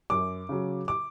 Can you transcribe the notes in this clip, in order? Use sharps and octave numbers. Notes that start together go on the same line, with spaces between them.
F#2 D6
C#3 F#3
D6